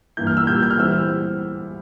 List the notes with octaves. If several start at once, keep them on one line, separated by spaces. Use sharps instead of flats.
G2 E3 A#3 E4 G6
F6
E6
A#2 G3 A#3 G6
G6
F6
E3 G3 C4 E4 E6